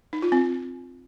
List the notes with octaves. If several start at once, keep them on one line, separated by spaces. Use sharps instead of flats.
D#4
F4
C4